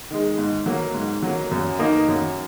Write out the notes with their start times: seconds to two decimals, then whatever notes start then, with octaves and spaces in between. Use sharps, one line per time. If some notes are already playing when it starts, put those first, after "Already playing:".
0.11 D#3 G#3
0.38 G#2
0.66 F#3 A#3
0.95 G#2
1.23 F#3 A#3
1.51 F#2
1.79 D#3 A#3 D#4
2.08 F#2